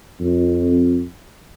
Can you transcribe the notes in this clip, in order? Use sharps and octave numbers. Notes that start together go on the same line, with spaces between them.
F2